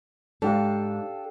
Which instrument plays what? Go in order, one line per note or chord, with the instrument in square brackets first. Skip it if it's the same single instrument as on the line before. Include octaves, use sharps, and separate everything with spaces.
[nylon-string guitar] G#2 [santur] D4 G4 F5 [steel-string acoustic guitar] A4